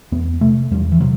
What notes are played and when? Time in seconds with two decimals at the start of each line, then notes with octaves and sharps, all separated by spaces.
0.12 E2 B3
0.41 C3 A3
0.71 E2 G3
0.92 E3
1.00 C3 F#3